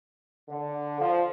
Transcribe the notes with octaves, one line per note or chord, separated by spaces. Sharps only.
D3
F3